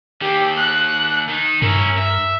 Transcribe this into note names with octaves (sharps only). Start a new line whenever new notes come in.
D#3 A#3 G4
F#6
D#3 D#4
G2 C#4 E4 A#4
E5